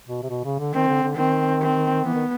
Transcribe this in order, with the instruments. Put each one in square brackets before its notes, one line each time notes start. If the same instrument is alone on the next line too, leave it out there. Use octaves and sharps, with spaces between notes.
[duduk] B2
C3
B2
C#3
D3
[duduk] D#3 [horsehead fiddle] C4
[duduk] D3
D3
[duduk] D#3 [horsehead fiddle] C4
[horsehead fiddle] C4
[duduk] E3 [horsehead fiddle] B3
[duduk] D#3